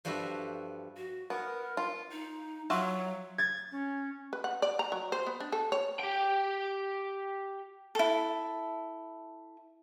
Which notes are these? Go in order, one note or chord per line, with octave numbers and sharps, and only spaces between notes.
G2 F3 G3 F#4 A4 E5
F#4
B3 A#4
F4
D#4
F#3 F4 F#4 E5
G#6 A6
C#4
B4
F#5
D5
A#5
F#3
C5
B3
D4
A4
C#5
G4 G5
E4 A4